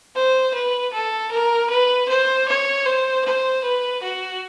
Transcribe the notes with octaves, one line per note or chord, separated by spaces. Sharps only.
C5
B4
A4
A#4
B4
C5
C#5
C5
C5
B4
F#4